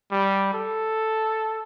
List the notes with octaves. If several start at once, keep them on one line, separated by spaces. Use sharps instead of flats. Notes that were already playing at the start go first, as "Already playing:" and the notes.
G3
A4